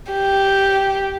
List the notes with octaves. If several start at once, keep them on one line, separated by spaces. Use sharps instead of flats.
G4